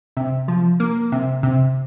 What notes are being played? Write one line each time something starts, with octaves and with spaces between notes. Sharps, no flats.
C3
F3
A#3
C3
C3